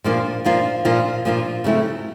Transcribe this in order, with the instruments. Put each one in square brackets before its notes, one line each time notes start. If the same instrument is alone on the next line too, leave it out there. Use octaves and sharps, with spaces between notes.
[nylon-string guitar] A#2 F3 A#3 D4 F4
A#2 F3 A#3 D4 F4
A#2 F3 A#3 D4 F4
A#2 F3 A#3 D4 F4
C#3 F#3 A3 C4 E4